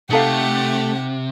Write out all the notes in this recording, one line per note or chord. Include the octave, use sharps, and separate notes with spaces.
C3 A3 D#4 G4 A4 F5 F#5